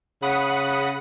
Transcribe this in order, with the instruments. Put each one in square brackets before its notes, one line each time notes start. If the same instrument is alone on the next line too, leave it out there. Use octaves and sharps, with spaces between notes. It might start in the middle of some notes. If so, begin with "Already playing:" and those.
[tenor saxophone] C#3 [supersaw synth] F#5 B5 D#6